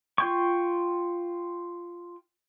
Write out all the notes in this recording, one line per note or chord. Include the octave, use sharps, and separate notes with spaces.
F4 G5 C#6